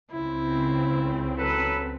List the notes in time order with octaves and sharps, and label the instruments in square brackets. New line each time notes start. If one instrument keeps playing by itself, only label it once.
[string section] C#2 C#3 C4 [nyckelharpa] E4
[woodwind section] F#3 A4 B4